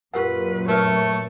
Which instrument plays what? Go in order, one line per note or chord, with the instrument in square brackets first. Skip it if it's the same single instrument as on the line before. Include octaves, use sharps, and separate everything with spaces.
[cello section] F#2 A#2 [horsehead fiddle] F4 B4 [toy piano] G4 A#4 F#5
[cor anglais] A3 [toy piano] A#4 B4 E5 [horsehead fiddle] C#5